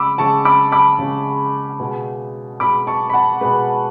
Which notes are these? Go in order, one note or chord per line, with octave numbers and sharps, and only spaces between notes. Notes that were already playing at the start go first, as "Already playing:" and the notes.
Already playing: C#3 G#3 B5 D6 E6
C#3 G#3 A5 C#6
B5 D6
B5 D6
C#3 G#3
B2 G#3
B2 G#3 B5 D6
A5 C#6
B5
F#5 A5
B2 G#3 B4